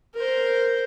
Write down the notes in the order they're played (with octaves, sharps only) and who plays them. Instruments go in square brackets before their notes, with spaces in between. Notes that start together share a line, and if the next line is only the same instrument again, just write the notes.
[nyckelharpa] A#4 C5